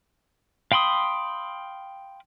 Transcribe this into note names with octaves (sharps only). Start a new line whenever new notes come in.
F5 G5 B5 C6 D#6